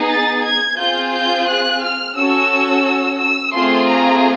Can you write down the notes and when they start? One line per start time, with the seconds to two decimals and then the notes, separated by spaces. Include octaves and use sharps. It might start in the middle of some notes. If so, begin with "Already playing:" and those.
Already playing: B3 D#4 G#4
0.10 A6
0.44 G#6
0.78 C4 F4 G#4 G6
1.13 G6
1.47 F#6
1.82 F6
2.16 C#4 F#4 A4 E6
3.19 E6
3.54 A3 C4 F4 G#4 C6
3.88 A#5